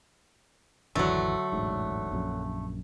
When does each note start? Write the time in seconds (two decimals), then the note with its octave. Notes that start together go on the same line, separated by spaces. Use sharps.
0.95 G#1 E2 D3 E3 F#3 A3
1.52 E1 A1 G#2
2.12 A#1 F#2